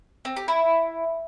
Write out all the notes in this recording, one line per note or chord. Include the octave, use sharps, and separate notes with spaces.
C4
G4
E4